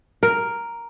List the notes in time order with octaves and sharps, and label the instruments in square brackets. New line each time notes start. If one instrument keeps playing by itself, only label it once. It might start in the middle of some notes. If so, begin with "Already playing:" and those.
[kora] A#4